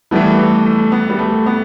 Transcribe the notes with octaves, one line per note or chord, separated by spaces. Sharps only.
E3 G3 A3 B3 E4
A3
A3
B3
G3
A3
B3